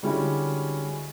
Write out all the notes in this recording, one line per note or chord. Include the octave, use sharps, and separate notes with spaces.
D3 G3 G#3 C#4 E4 F#4